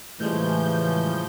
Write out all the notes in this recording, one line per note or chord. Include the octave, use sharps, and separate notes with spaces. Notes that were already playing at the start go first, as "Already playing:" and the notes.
A2 C#3 E3 F3 G3 G#3 G6